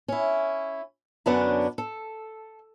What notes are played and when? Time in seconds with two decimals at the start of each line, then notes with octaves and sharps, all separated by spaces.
0.08 C#4 E4
1.26 F#2 D3 B3 C#4 D4 A#5
1.78 A4